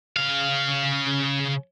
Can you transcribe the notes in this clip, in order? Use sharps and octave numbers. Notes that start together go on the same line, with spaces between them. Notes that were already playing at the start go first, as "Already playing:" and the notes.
C#3 F5